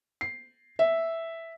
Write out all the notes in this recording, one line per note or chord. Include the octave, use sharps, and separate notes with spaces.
C7
E5